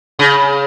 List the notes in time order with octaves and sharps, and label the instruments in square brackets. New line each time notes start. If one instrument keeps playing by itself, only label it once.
[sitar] C#3